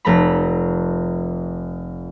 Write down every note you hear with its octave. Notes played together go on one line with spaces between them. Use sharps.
F1 A3 A#5 B5